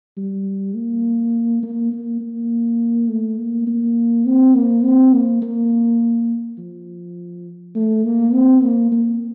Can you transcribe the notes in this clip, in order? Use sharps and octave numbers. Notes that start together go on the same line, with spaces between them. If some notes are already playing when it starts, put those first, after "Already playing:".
G3
A#3
A#3
A#3
A#3
A3
A#3
A#3
C4
A#3
C4
A#3
A#3
F3
A3
A#3
C4
A#3
A#3